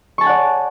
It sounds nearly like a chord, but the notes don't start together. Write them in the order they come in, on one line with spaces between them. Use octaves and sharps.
C#6 A5 G#5 F#5 D5